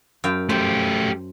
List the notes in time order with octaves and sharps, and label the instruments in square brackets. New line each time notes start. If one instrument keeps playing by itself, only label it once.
[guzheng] F#2 F5 G5
[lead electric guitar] A3 G4 [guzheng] C5